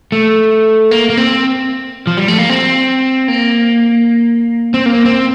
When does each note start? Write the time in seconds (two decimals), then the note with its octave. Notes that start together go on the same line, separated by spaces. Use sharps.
0.12 A3
0.91 A#3
1.10 A#3
1.17 C4
2.07 F3
2.17 G3
2.28 A3
2.39 A#3
2.49 C4
3.28 A#3
4.74 C4
4.86 A#3
5.05 C4